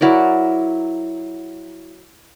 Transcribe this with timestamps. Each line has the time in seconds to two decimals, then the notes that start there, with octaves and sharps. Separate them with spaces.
0.01 F#3 E4 A#4 D5